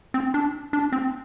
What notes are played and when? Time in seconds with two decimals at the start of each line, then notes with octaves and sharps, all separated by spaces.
0.14 C4
0.34 D4
0.73 D4
0.92 C4